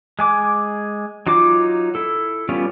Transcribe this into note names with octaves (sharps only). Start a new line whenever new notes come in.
G#3 G#5 D6
F#3 D#4 F4 D6
E4 A4
G3 B3 C#4 F4